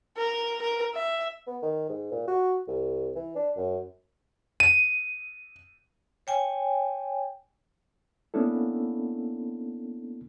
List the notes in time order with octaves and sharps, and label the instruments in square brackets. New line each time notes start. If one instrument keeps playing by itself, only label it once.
[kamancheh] A#4
A#4
E5
[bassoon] B3
D#3
G#2
A#2
F#4
C2
E3
D4
F#2
[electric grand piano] D#7
[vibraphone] C#5 G5 G#5
[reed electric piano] A#3 B3 C#4 D4 E4 A4